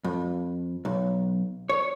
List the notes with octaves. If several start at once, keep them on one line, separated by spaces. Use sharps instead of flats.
F2
B1
C#5